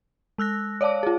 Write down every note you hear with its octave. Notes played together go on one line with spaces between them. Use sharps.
G#3 E6 F#6 A#6
C#5 D5 F5 A5 D6
F4 G#4